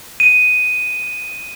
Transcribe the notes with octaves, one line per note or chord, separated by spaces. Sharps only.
D#7